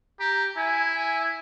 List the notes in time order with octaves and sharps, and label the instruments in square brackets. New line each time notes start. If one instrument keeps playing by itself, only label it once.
[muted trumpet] G4 [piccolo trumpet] A#5
[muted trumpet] E4 [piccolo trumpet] G#5
[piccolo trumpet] G#5